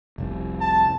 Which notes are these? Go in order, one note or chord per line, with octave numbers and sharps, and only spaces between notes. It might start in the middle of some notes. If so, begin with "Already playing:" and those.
F1 C2
A5